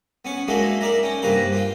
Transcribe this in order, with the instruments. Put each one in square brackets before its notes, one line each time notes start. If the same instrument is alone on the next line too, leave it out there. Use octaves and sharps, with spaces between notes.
[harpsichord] B3 C#4 C#6
F#3 G#3 A#3 D4 D#4 E5
A#4 D5 E5 A#5
C#4 G5
G2 C3 A#3 B4 A#5
F4 G5